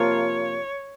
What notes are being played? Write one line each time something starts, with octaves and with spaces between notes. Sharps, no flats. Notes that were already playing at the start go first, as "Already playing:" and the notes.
Already playing: C3 F3 A#3 F4 C#5